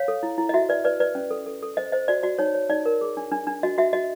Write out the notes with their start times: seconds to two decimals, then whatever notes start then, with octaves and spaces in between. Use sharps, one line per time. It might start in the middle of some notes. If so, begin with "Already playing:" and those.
Already playing: C#5 F5
0.08 A4
0.23 E4
0.38 E4
0.49 D#5
0.54 F#4 E5
0.69 B4 D5
0.85 B4 D5
1.00 B4 D5
1.15 C#4
1.31 A4
1.46 A4
1.63 A4
1.77 C5 D#5
1.92 C5 D#5
2.08 F#4 D5
2.23 F#4 D5
2.39 D#4 C#5
2.55 C#5
2.69 D#4 D5
2.86 A#4
3.01 G#4
3.17 D4
3.32 D4
3.47 D4
3.63 F#4 D#5
3.78 F#4 E5
3.93 F#4 D#5